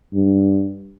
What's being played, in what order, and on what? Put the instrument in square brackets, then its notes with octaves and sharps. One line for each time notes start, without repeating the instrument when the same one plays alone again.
[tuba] G2